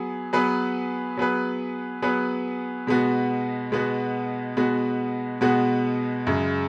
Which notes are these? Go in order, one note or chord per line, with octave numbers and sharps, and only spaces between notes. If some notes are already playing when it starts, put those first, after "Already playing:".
Already playing: F#3 B3 G#4
F#3 B3 G#4 B4
F#3 B3 G#4 B4
F#3 B3 G#4 B4
B2 G#3 B3 F#4
B2 G#3 B3 F#4
B2 G#3 B3 F#4
B2 G#3 B3 F#4
F#2 C#3 G#3